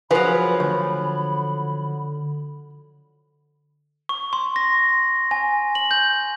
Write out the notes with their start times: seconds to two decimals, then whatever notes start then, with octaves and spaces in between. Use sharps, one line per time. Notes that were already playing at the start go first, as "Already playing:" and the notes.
0.11 F3 F#3 G#4 A#4 B4 B5
0.60 D3 A3
4.09 C#6
4.33 C6
4.56 A#6
5.31 G#5
5.75 F#7
5.91 G6